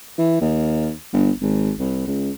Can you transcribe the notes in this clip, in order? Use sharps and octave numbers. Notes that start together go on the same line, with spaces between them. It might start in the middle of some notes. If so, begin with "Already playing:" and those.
E3
D#2
G1
G#1
C2
C#2